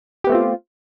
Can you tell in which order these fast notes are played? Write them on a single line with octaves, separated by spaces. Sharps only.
G4 B3 A3 C4 F4